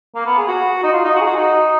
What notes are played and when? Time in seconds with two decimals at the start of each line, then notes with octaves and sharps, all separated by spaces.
0.15 A#3
0.26 B3
0.38 G#4
0.48 F#4
0.84 D#4
0.93 F4
1.04 D#4
1.15 F#4
1.21 G#4
1.27 F#4
1.37 D#4